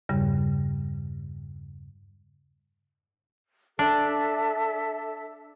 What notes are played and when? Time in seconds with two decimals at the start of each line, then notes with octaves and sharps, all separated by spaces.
0.09 E2 G2 C#3 G3
3.79 D4 A4 E5